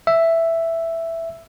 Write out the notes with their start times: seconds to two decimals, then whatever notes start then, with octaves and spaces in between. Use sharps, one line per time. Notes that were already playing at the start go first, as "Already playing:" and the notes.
0.07 E5